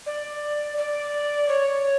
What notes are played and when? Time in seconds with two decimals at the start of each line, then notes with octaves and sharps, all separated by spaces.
0.06 D5
0.77 D5
1.49 C#5